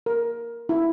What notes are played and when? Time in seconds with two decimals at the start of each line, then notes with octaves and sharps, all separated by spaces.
0.06 A#4
0.69 E4